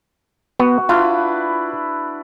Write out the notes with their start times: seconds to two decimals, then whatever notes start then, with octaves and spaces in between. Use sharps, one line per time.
0.59 B3 F#4
0.89 D4 E4 F4 B4